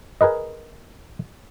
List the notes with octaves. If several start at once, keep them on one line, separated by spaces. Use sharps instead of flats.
G#4 A#4 B4 D#5